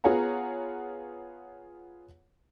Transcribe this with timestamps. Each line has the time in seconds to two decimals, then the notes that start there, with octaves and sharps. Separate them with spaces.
0.04 B3 F4 G#4 C#5 F#5 A#5